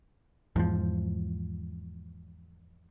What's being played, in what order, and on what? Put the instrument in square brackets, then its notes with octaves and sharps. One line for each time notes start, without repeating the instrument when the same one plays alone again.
[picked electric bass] E2 G#2 F3